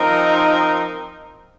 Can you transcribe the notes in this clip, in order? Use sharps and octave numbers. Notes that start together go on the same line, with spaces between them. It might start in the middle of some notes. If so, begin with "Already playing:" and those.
Already playing: F3 C4 D#4 A#4